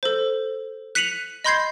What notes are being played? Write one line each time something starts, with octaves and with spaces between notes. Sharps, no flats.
A4 C5
F#6 B6 C#7 D#7 F7 F#7
D#5 B5 C6 G6 G#6 C7